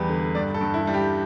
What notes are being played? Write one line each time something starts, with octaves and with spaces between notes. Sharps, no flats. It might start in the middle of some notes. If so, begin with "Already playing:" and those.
Already playing: E2 G3 B4
D3
G2 D5
A4
G2
E4
G3
G4